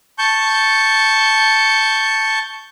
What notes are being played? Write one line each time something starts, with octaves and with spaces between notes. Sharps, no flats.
A5 C#6 G6